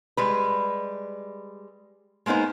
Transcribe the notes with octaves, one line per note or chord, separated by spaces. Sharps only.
G3 G#3 B4
G#3 A#3 B3 D#4 C5